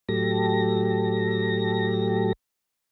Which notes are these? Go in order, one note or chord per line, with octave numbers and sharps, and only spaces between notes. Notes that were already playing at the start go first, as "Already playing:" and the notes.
A2 F#3 G4 A4 A#6